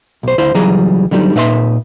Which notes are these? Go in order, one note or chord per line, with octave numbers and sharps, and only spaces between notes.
B1 C5
D2 E4 C5
C#2 E3 F#3 G3 G#4 A#5
D3 F#3 G3 C4 D#4
A#2 D#4 B4 E5 F5 C6